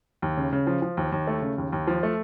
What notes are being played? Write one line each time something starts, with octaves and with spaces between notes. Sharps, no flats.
D#2
C#3
C#3
F3
F3
D#2
D#2
A3
C#3
D#2
D#2
F3
A3